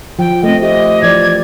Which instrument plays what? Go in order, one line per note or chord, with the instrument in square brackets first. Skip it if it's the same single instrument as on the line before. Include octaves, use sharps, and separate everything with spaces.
[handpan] F3 [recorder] G5
[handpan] A3 C4 [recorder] D#5
[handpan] G4 [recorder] D#5
[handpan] E3 F3 D5 [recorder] G#6